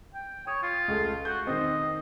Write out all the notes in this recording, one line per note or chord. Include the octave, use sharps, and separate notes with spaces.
G5
C#5 D#6
F4
C#2 A3
F#4 G6
D#3 C4 D#5